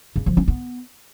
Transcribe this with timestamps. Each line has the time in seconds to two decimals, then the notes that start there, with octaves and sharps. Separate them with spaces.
0.16 C#3
0.26 F3
0.37 C#4
0.48 B3